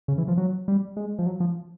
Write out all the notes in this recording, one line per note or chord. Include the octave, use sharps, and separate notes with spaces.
C#3
E3
F3
F#3
G3
G#3
F3
F#3
F3